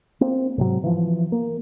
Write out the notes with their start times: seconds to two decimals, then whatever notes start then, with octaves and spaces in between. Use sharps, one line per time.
0.21 A#3 C4
0.58 G#2 C3 F#3
0.84 E3 F3
1.32 A#3